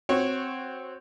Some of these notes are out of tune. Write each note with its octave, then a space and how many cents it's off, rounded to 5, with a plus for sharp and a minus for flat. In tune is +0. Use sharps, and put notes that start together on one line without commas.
C4 +0 F#4 +0 C#5 -15